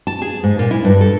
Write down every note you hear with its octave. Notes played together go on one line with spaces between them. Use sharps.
A5
G#4
G#2
A#2
E4
G2
A4